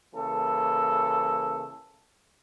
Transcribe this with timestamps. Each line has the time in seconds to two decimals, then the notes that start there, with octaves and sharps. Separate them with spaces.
0.14 C#3 E3 A#3 A4